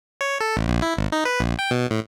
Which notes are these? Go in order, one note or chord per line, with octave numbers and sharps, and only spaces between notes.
C#5
A4
A1
A#1
E4
G#1
D#4
B4
A#1
G5
B2
A2